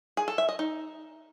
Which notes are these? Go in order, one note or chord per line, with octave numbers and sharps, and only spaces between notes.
G#4
A4
E5
D#5
D#4